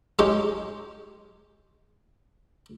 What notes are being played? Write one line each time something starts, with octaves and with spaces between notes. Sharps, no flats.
G#3 C#4 D#4 G4